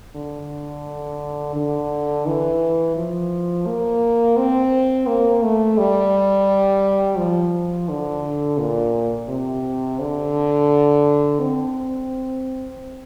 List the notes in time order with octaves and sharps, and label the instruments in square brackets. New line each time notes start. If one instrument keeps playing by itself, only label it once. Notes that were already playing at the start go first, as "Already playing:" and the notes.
[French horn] D3
D3
E3
F3
A#3
C4
A#3
A3
G3
F3
D3
A#2
C3
D3
C4